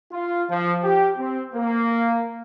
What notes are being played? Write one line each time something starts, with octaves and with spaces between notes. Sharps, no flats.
F4
F3
G4
C4
A#3